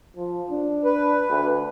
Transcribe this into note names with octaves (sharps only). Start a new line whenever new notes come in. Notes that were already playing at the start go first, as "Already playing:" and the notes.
F3
D4
B4
D2